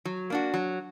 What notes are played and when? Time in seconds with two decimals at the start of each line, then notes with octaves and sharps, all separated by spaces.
0.05 F#3
0.30 A#3 D4 F#4
0.54 F#3